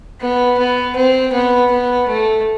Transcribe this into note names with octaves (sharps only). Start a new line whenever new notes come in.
B3
B3
C4
B3
B3
A3